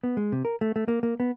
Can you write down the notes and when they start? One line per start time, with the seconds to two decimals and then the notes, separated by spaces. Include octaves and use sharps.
0.03 B3
0.17 G#3
0.32 C3
0.45 A#4
0.61 A3
0.76 A3
0.88 A#3
1.03 A#3
1.20 B3